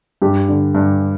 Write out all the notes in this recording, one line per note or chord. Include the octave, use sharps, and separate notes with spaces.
G2 G4
D3
G2